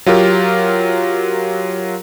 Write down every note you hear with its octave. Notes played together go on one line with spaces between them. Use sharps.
F#3 F4 G4 A#4